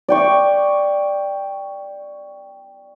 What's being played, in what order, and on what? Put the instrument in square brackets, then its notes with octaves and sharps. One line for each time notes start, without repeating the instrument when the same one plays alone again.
[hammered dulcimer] D5 G5 C#6